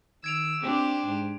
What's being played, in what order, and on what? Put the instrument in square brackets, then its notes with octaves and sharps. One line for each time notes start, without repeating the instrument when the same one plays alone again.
[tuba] D#3 [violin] E6 [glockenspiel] G#6 D7 F7
[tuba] C4 [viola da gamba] D4 [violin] G4 C5
[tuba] G#2